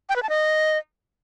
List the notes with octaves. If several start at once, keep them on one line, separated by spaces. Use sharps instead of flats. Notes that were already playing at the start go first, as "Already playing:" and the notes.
G5
B4
A5
D#5